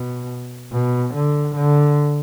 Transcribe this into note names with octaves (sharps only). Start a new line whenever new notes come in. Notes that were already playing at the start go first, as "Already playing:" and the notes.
Already playing: B2
B2
D3
D3